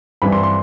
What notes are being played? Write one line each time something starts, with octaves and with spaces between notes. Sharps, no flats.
G2 E3 G3 C4 E4 B5
C6
C6